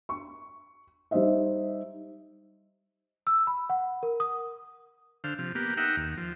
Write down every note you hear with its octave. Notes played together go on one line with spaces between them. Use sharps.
C#6
G3 D#4 C5 D#5 E5
E6
B5
F#5
A#4
D#6
D3 C5 F5
C3 F3
A#3 B3 G4
D#4 A#4 E5 F#5 G5
D#2
F3